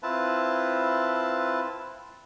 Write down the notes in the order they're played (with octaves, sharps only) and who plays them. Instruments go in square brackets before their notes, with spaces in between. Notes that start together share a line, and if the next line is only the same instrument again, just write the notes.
[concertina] C4 E4 F4 B4 A5